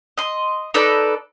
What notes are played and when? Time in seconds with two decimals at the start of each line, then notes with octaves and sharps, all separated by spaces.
0.18 D#5 C6
0.74 D#4 A4 B4 D5